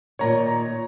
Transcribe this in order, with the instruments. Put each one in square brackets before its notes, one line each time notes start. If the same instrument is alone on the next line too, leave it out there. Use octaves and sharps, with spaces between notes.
[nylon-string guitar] A#2 D#3 [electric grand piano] C#5 A#5